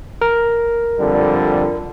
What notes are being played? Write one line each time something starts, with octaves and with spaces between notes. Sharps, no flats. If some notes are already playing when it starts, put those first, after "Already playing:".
A#4
F2 D3 G3